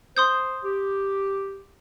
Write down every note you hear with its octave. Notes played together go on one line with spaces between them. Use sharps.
C5 C6 D#6 G6
G4